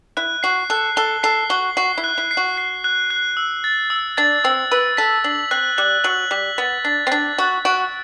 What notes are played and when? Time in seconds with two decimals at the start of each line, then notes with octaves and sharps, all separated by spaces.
0.17 E4 F#6
0.43 F#4 C7
0.70 A4 F#6
0.96 A4 G7
1.23 A4 C7
1.50 F#4 G7
1.77 F#4 C7
1.98 E4
2.04 F#6
2.18 E4
2.31 C7
2.37 F#4
2.57 C7
2.84 F#6
3.10 F#6
3.37 E6
3.64 A6
3.90 E6
4.17 D4 A6
4.44 C4 E6
4.71 B4 E6
4.97 A4 B6
5.24 D4 F#7
5.51 C4 F#6
5.78 G3 F#6
6.04 F#3 F#7
6.31 G3 B6
6.58 B3 A6
6.85 D4 A6
7.07 C4
7.11 D4 A6
7.38 F#4 A6
7.65 F#4 D7